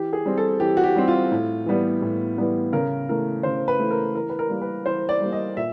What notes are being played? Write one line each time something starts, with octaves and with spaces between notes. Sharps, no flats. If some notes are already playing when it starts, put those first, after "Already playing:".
Already playing: E3 G4
G#4
G3 C4
A4
E3 G4
F#4
G4
G3 C4
F4
A2
E3 G3 B3
A2
E3 G3 B3
C#3 A#4
E3 A3 A#4
C#3 C5
B4
E3 A3
A#4
E3 A#4
B4
A#4
G3 A#3
B4
E3 C5
D5
G3 A#3
D#5
A#2 E5